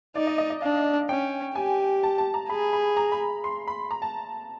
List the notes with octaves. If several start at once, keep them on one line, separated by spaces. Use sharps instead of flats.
D#4 D5
D#5
D#5
D#5
D4 F5
C#4 G5
G4 G#5
A5
A5
A#5
G#4 B5
B5
A#5
B5
C6
B5
A#5
A5